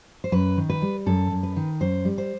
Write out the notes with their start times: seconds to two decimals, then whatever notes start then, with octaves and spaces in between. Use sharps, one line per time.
0.24 C5
0.32 F#2 B4
0.57 D#3
0.70 B4
0.82 G3
1.06 F#2 A4
1.31 F#2
1.43 B4
1.56 D#3
1.80 F#2 C5
2.05 G3
2.18 C5